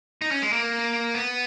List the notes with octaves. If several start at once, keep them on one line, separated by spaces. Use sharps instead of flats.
D#4
C#4
G#3
A#3
B3